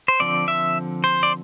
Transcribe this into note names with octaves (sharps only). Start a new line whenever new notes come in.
C5
D3 F3 C4 D5
E5
C5
D5